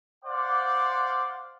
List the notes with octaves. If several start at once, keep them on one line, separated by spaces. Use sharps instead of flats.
C5 D5 F5 F#5 C6 D6